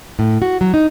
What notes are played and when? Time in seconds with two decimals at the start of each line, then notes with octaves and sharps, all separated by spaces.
0.19 A2
0.42 F#4
0.61 F#3
0.74 D#4